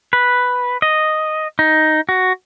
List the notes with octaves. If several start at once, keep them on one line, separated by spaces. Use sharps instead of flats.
B4
D#5
D#4
F#4